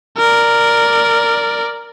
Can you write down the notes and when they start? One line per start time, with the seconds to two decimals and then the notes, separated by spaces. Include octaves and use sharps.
0.18 A#4 D5